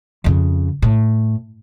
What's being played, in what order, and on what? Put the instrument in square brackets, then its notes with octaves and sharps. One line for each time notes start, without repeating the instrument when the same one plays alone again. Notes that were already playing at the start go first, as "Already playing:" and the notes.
[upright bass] F2 C#3
A2